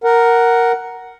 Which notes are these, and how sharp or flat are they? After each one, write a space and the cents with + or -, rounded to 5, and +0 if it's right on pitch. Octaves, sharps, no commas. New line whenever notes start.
A#4 +0 F#5 +5